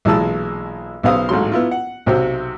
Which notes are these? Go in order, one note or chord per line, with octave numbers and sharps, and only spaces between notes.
B1 A#2 E3 G#3 A5 E6
B1 C#3 B3 C5 F5 D#6
A1 G#2 F#3 C6
B3 E4 F4
F#5
B1 C3 F#3 C4 F#4 C5